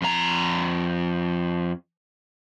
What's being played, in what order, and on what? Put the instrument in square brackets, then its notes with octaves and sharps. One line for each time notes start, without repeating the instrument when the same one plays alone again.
[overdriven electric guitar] F2 A#5